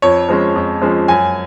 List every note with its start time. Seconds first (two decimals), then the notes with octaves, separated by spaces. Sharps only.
0.02 F2 C#5
0.29 F3 G#3 C#4
0.56 F2
0.82 F3 G#3 C#4
1.08 F#2 G#5